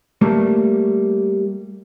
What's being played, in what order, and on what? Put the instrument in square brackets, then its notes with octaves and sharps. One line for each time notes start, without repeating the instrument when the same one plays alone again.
[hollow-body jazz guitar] G3 A3 A#3